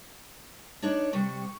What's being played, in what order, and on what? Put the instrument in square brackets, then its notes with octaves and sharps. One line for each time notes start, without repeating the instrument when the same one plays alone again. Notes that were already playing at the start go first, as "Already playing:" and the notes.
[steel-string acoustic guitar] D4 C#5 D5 [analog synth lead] D#4
[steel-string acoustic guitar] C3 G3 [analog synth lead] C#6